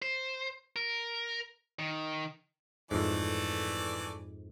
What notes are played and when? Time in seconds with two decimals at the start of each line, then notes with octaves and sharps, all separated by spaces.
0.02 C5
0.76 A#4
1.79 D#3
2.91 F2 G#2 E3 A3 D5